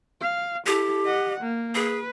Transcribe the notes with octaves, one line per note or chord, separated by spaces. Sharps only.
F5
E4 G4 A4
D#5 F#5
A#3
G#4 B4